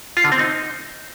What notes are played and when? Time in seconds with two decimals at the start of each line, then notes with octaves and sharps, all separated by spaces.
0.17 F4
0.24 D3
0.32 C4
0.39 D#4